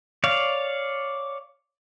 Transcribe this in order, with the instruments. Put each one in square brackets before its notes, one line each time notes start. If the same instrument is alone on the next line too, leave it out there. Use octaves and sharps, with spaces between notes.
[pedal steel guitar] C#5 D5 F5